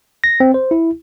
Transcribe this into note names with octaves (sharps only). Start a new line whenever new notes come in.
A#6
C4
C5
E4